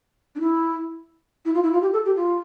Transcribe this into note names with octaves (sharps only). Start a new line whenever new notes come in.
D4
E4
E4
F4
E4
F4
G4
A4
G4
F4